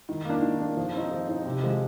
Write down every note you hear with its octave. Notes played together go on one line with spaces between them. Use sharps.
D#3
A#3 D4
D#3
A#3 D4
F3
C4 D#4
F3
C4 D#4
C3
F3 G#3